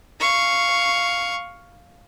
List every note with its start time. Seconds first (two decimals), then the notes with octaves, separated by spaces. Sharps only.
0.20 F5 C#6